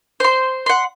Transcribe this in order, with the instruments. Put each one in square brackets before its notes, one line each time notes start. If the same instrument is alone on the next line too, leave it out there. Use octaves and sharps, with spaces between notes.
[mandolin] C5 C6
F#5 C6